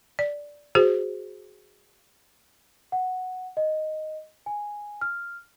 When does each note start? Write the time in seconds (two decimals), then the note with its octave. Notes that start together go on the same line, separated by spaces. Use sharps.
0.19 D5
0.75 F#4 G#4 C5
2.92 F#5
3.57 D#5
4.46 G#5
5.01 F6